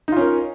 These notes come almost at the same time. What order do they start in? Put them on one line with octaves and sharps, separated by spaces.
D#4 F4 C#4 A#4